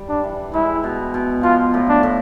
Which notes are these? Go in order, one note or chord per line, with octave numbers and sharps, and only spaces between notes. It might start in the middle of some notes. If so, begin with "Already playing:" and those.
Already playing: G3
D4
E3
G#3 E4
B2
B2
F3 F4
A2
D4
A2